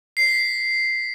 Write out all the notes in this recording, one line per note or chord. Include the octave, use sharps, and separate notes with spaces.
C7
B6
C7